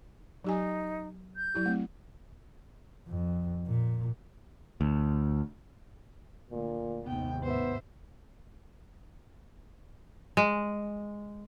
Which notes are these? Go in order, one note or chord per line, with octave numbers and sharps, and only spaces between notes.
F#3 D#4 G4 G#5
G6
F#3 E4 G4
A3 C4
F2
A#2
D2
D2 A#2
D#2 G#2 C3 B3 G5
B3 C5 E5
G#3